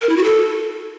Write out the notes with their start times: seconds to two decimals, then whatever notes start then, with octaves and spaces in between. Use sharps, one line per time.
0.02 A#4
0.09 E4
0.17 F#4
0.24 A4